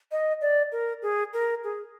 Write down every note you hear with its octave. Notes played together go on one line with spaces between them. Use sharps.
D#5
D5
A#4
G#4
A#4
G#4